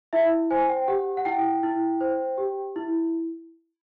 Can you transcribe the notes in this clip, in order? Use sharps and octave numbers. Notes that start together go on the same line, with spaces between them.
E4 E5
C5 G#5
G5
G4 F#5
F#5
E4 G5
E4
C5
G4
E4